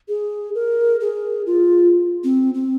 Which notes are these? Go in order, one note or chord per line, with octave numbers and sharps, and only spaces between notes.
G#4
A#4
G#4
F4
C4
C4